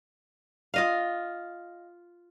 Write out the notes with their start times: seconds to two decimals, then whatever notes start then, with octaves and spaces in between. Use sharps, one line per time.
0.74 F4 D#5 F5